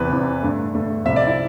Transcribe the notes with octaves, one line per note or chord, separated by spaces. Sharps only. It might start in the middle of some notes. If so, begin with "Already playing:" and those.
Already playing: E2 C3 E3 B4
E2 C3 E3
G2 D3 A3
G2 D3 A3
C2 C3 F3 E5
D5
E4